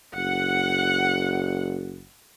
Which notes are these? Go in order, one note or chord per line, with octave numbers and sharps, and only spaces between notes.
F#1 F#5